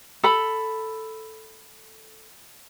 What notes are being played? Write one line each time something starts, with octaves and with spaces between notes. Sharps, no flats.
A4 B5